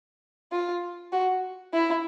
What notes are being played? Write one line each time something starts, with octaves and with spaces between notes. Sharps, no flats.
F4
F#4
E4